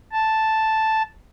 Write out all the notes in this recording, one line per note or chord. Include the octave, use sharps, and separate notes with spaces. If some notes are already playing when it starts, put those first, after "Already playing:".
A5